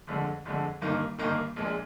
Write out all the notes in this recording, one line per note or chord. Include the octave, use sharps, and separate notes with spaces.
G1 F2 D3 G#3
G1 F2 D3 G#3
G1 G2 D#3 A#3 D#4
G1 G2 D#3 A#3 D#4
A#1 A#2 G#3